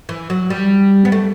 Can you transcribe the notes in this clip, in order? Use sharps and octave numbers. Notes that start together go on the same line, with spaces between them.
E3
F#3
G3
B3
A3